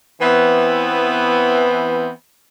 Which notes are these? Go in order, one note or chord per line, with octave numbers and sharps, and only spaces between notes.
E3 B3 C4